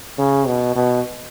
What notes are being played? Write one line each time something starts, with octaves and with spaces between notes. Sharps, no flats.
C#3
B2
B2